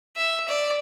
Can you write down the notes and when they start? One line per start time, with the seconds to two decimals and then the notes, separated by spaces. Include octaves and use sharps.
0.17 E5
0.48 D5